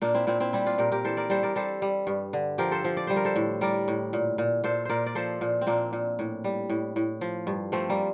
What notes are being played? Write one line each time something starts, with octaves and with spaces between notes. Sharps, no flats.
A#2 A#3 D4
C4 E4
A#2 C4 E4
C4 E4
G3 E4 G4
D4 F4
A#2 G4 A#4
G4 A#4
E3 A4 C5
A#4 D5
G3 A4 C5
A#4 D5
G3 A4 C5
G3
G2
D3
F3 G4 A#4
A4 C5
F3
D5
G3 C5
A#4
A4 C5
A2
G3 A#4 D5
A2
A#2
A#2
A#2 A4 C5
A#2 A#4 C5 D5
D5
F3 A4 C5
A#2
C4
A#2 A#3 D4
A#2
A2
G3
A2
A2
F3
G2
F3 A3 C4
G3 A#3